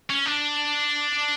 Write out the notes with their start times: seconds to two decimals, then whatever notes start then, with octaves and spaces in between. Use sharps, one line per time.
0.10 C#4
0.26 D4